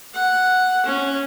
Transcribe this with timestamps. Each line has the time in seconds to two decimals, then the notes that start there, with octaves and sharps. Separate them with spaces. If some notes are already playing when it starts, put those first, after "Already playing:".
0.14 F#5
0.86 C#4